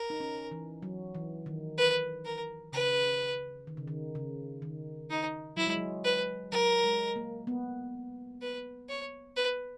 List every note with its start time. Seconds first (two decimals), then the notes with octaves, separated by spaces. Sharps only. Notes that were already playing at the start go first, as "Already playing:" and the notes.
Already playing: A#4
0.10 D#4
0.20 C#4
0.51 E3
0.82 F#3
1.15 E3
1.46 D#3
1.78 B4
2.25 A#4
2.72 C#3 B4
3.67 D#3
3.77 C#3
3.88 D#3
4.15 C#3
4.62 D#3
5.10 D#4
5.57 F#3 E4
5.67 G#3
5.77 F#3
6.04 B4
6.52 F#3 A#4
6.84 G#3
7.16 A#3
7.47 B3
8.42 B4
8.89 C#5
9.36 B4